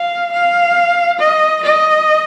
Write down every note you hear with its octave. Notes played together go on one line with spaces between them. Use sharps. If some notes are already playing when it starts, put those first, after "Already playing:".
Already playing: F5
F5
D#5
D#5